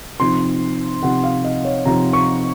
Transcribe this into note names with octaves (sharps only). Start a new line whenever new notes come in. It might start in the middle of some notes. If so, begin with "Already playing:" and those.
C3 F3 C4 D#4 C6
C3 F3 C4 D#4 F#5
F5
D#5
C#5
C3 F3 C4 D#4 A#5
C#6